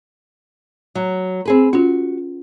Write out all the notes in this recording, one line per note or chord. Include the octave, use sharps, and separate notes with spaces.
F#3
C4 G#4 B4
C#4 F4 F#4